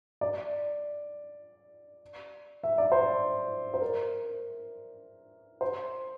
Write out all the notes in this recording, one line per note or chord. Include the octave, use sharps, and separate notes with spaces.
D5
E5
D5
C5
C5
A#4
C5